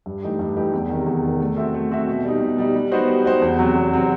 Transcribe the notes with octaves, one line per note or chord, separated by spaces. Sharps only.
G2
E3 A3 D#4 G4
G2
E3 A3 D#4 G4
E2
C3 D#3
E2
C3 D#3
A3
C4 F#4 A4 E5
A3
C4 F#4 A4 E5
B2
G3 D#4
B2
G3 D#4
G3
B3 D#4 F#4 C5
G3
B3 D#4 F#4 C5
E2
C3 F#3 C4 F#4
E2
C3 F#3 C4 F#4